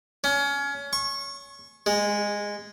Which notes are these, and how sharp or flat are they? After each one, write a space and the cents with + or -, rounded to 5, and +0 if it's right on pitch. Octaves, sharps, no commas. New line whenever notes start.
C#4 +25
C#6 -25
G#3 -15